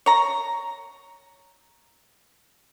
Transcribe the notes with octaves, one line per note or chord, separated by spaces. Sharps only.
C#5 A#5